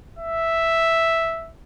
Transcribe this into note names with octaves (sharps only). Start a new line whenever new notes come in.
E5